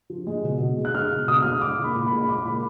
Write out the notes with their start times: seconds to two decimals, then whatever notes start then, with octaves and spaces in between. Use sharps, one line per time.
0.10 F3
0.27 G#3
0.44 B2
0.60 B2
0.77 G#3
0.85 F#6
0.94 G#3 F6
1.11 B2
1.28 B2 D#6
1.42 G#3 F6
1.52 D#6
1.61 G#3 D6
1.79 A#2
1.84 B5
1.96 A#2
2.06 B5
2.12 G#3
2.21 B5
2.29 G#3 D6
2.46 A#2 B5